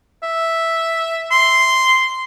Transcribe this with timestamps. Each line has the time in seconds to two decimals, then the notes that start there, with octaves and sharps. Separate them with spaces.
0.23 E5
1.31 C6